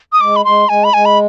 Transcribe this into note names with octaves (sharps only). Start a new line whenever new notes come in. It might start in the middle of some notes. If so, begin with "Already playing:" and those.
D#6
G#3 D6
B5
G#3 C6
G#3 G#5
B5
G#3 G#5
B5